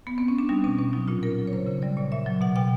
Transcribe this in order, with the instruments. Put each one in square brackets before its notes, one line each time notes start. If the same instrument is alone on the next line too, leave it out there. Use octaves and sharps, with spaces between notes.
[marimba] B3
C4
C#4
D4
G3 D#4
B2 C#4
B2 C#4
F#3 D#4
A#2 F4
A#2 A#4
F#3
C#5
C#3 C5
C#3 C5
G3 D5
A#2 D5
A#2 E5
F#3
B2 F#5
B2 G5